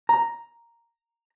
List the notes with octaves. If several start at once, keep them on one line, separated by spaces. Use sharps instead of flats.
A#5